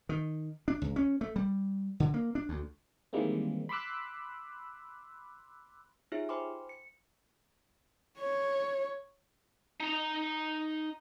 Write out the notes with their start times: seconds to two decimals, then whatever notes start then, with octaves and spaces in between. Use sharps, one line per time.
0.09 D#3
0.68 D4
0.82 C#2
0.96 C#4
1.21 A3
1.36 G3
2.00 D3
2.14 A#3
2.35 D4
2.49 D2
3.13 D#3 E3 G3 G#3 A#3 C4
3.69 B5 C6 D6 E6 F#6
6.12 D#4 F4 G4 G#4 C#5 E5
6.29 C5 G5 G#5 B5 C6 D6
6.69 C#7
8.18 C#5
9.80 D#4 A#5